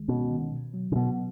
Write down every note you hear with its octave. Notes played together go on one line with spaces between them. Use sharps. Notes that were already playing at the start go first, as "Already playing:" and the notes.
Already playing: C#2 D#3 G#3
B2 C#4
D#3
B2
F#3
C#3
B2 B3